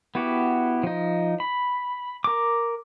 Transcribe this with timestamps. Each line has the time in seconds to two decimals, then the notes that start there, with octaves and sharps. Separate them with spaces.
0.15 B3 E4 F#4 G4
0.83 F3 D#4
1.40 B5
2.24 A#4 D6